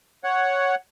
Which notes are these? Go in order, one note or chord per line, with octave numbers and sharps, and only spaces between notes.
C#5 F#5